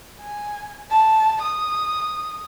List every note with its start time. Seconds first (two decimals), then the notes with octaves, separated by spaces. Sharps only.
0.21 G#5
0.91 A5
1.41 D#6